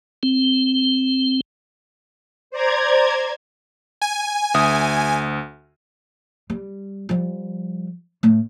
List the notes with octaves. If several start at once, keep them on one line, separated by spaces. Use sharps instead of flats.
C4
C5 D5 A#5 G#6
G#5
D2 E5 D#6
G3
F3 G3
A2 A3